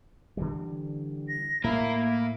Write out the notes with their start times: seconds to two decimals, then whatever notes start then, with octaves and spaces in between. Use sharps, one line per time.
0.37 D3 E3 G3
1.28 A#6
1.64 A2 A#3 E4 A#4